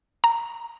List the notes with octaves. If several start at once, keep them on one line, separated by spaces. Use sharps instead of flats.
A#5